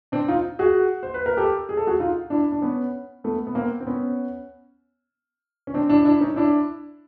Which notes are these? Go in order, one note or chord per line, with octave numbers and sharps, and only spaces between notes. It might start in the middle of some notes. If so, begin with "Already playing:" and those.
C4 D4
D#4 F4
F#4 G#4
C5
B4
A#4
G4 A4
G#4
A4
F#4 G#4
D#4 F4
D4 E4
D4
B3 C#4
A3 B3
B3
A#3 C4
C4
B3 C#4
C#4
C4 D4
D4 E4
D4 E4
C#4 D#4
D4 E4